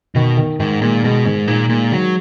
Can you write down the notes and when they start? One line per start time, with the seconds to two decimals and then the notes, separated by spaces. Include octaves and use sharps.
0.15 B2 D#3
0.37 D#3
0.60 G#2 D#3
0.81 A#2 G#3
1.04 B2 G#3
1.25 G#2 D#3
1.48 A#2 D#4
1.69 A#2 G#3
1.92 D#3 F#3